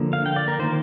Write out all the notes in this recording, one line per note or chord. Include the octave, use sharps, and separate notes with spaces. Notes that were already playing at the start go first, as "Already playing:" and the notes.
Already playing: D3 F3 A#3
F5
G5
D5
A#4
D#3 A#3 C5